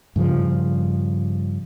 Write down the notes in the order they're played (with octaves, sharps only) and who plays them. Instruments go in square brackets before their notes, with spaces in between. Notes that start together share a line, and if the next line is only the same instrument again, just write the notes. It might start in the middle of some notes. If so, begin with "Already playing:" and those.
[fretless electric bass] G2 C#3 F3